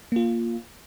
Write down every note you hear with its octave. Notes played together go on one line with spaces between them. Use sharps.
A#3 F4